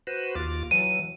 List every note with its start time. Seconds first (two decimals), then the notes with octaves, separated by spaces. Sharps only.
0.07 F#4 B4 C5
0.35 D#2 F4 D6
0.71 E3 F#3 D#7